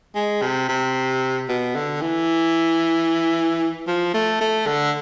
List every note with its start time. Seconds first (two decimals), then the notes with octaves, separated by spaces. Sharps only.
0.15 G#3
0.42 C3
0.69 C3
1.48 B2
1.75 D3
2.01 E3
3.87 F3
4.14 A3
4.41 A3
4.67 D3